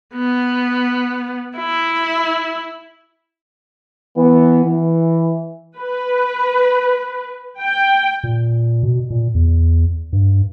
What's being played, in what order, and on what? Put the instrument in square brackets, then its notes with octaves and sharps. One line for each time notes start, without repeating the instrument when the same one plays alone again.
[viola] B3
E4
[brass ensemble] E3 B3
E3
[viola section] B4
G5
[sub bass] A#2
B2
A#2
E2
G2